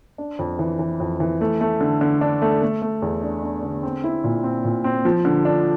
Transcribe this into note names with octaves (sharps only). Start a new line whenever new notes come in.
D4
F2
E3
E3
F2
E3
A3
A3
D3
D3
D4
A3
A3
A3
E2
D4
D4
D3
C4
E4
A#2
C4
A#2
C4
F3
D3
D4